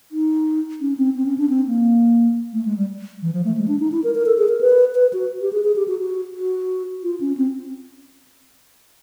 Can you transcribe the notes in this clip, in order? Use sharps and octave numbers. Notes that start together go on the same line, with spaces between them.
D#4
C#4
C4
C4
C#4
D4
C4
A#3
A3
G#3
G3
E3
F3
A3
G#3
D4
D#4
E4
A#4
A#4
A4
G#4
A#4
B4
B4
F#4
G4
G#4
G#4
G4
F#4
F#4
F#4
F4
C#4
C4